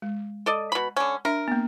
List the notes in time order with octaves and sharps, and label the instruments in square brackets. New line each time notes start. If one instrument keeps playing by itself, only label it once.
[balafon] G#3
[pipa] A4 D5 D#5
B2 B5
D3 C#4
[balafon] D4 E5 [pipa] A#4
[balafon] A#3 B3